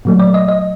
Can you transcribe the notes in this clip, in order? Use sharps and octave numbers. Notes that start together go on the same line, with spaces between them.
A#2 F#3 A3
D5
D#5
D#5